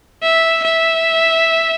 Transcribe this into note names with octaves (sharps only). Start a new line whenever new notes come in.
E5
E5